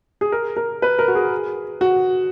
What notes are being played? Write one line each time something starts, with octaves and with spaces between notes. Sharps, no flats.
G#4
A#4
A#4
B4
A#4
F#4
G#4
F#4